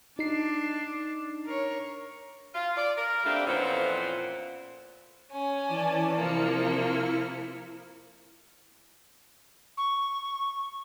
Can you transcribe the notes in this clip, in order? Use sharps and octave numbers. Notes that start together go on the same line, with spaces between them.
D4 D#4 C7
A#4 C#5
F4
D5
A#4
G3 A3 A#3 C4 D4 F4
F2 A#2 E3 B3 C#4 C5
C#4 G#5
E3 D5 A5
C3 F3 A#3 E4 F6 C#7
C#6